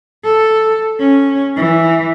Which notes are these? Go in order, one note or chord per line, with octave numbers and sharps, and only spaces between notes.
A4
C#4
E3